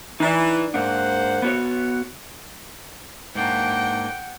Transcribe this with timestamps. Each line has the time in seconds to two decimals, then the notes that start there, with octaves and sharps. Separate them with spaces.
0.20 E3 D#4 D5
0.74 G#2 A#3 D4 C5 F#5
1.42 B3 F#4 C#5
3.35 G#2 A#3 D4 F#5 G5